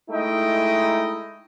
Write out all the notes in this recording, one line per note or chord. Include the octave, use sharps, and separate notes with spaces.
G#3 A3 D#4 E4 D#5 G5